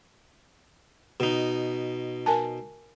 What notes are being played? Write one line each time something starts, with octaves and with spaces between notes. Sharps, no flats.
B2 D#4
A#4 G#5 A5